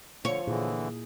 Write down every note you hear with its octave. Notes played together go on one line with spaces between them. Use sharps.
D3 F3 C#5
A#2 D3 E3 E4 G#4